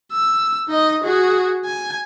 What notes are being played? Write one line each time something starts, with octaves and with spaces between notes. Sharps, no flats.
E6
D#4 D#5
F#4 G#4
G#5